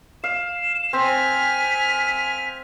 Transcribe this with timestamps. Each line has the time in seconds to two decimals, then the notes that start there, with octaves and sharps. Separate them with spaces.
0.24 F5 E7
0.93 C4 G#5 F6 B6